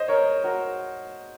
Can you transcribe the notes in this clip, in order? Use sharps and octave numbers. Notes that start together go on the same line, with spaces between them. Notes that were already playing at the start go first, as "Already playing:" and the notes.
Already playing: C5 D#5
A#4 C#5
F#4 A#4